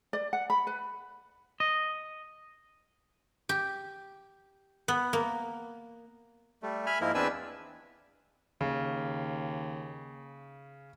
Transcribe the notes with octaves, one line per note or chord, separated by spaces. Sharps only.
D5
F#5
B5
B4
D#5
G4
B3
A#3
G3 A3
E5 G#5 B5 F6
G#2 F3 G#3 A#3 E4 A#4
E2 C4 D4 B4 G#5 E6
D#2 C#3